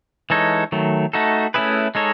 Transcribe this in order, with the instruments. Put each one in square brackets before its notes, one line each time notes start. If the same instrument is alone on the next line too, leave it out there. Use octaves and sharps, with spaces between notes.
[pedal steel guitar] E3 G#3 D#4 A4 C#5
D#3 F#3 A3
A3 D#4 F#4 A4
A3 C#4 E4 G#4 B4
G#3 D#4 A4 C#5